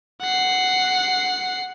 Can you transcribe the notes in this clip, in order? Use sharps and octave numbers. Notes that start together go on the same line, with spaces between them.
F#5 C7